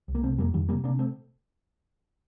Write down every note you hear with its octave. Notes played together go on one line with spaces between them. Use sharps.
C2
A#3
C3 A3 C4
F2 G3 A#3
F2 D#3 G3
C3 G3 A#3
C3 A#3 D4
A3 C4